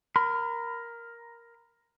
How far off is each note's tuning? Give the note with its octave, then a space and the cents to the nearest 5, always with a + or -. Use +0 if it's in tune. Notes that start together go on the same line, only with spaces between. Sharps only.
A#4 +5 B5 +35